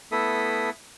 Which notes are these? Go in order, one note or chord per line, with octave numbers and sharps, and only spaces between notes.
A3 B3 E4 A4 E5 D#6